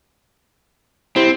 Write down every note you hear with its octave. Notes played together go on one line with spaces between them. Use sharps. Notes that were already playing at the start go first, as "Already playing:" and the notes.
C4 E4 G4 C5